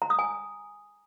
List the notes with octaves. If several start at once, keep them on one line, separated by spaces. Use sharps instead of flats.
A#5
D#6
G#5